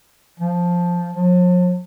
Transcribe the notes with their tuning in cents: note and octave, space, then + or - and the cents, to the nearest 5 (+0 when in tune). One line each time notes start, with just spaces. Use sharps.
F3 +5
F3 +45